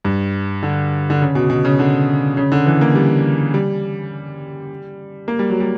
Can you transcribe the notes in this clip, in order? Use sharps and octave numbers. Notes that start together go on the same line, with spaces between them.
G2
D3
D3
C#3
B2
B2
C#3
D3
C#3
D3
E3
A#3
G3
G3
A#3
G3
F#3
G3